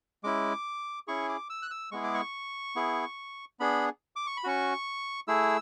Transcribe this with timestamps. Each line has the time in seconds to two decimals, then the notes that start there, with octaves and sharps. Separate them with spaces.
0.24 G#3 C#4 E4 D6
1.08 C#4 E4 G#4 C#6
1.29 D6
1.50 E6
1.62 F#6
1.71 E6
1.92 G#3 B3 E4 G#4 C#6
2.03 D6
2.14 C#6
2.76 B3 E4 G#4
3.60 B3 D4 G#4 B5
4.16 D6
4.27 C#6
4.37 B5
4.44 C#4 F#4 C#6
5.28 A3 E4 G#4 E6